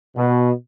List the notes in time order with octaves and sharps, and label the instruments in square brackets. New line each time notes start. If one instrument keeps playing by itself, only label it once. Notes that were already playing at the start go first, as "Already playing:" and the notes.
[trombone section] B2